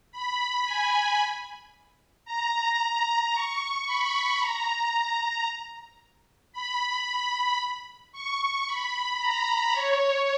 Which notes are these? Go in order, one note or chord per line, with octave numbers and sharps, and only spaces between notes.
B5
G#5
A#5
C#6
B5
A#5
A#5
B5
C#6
B5
A#5
C#5